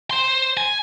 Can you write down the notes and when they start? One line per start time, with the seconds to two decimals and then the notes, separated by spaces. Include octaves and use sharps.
0.11 C5 C6
0.57 G#5